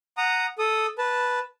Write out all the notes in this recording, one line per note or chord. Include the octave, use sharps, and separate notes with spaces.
F#5 A#5 D#6
A4 D#6
B4 A5